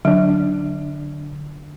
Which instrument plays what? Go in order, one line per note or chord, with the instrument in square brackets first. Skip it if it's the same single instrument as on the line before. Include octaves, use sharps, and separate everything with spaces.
[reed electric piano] D3 D4 [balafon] F#3